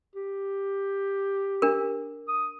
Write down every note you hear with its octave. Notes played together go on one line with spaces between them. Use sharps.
G4
D4 A#4
D#6